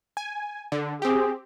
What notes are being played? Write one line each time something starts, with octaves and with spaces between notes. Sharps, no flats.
G#5
D3
C4 G4 G#4